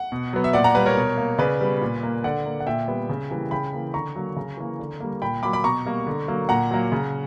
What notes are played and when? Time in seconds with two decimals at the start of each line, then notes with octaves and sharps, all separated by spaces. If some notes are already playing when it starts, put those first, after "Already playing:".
Already playing: F#5
0.12 B2
0.33 F#3 B3
0.44 E5
0.53 A#2 D5 F#5
0.64 F#5 A#5
0.75 G3 A#3 B4
0.86 A#4 C#5
0.96 B2
1.18 A#3
1.38 C#3 B4 D5
1.61 G3 B3
1.81 A#2
2.03 A#3
2.24 D3 D5 F#5
2.45 A#3
2.60 F#5
2.67 A#2 E5 G5
2.88 G3 B3
3.09 C#3
3.31 E3 G3 A#3
3.51 C#3 G5 B5
3.73 E3 A#3
3.94 D3 A#5 C#6
4.15 F#3 A#3
4.36 C#3
4.57 E3 A#3
4.79 D3
5.00 G3 A#3
5.22 A#2 G5 B5
5.43 F#3 A#3 B5 D6
5.53 B5 D6
5.64 B2 A#5 C#6
5.86 G3 A#3
6.07 D3
6.28 F#3 A#3
6.49 A#2 F#5 A#5
6.71 F#3 A#3
6.92 C#3